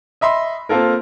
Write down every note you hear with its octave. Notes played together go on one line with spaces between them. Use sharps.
D#5 E5 B5 C6
A#3 C4 F4 A4 A#4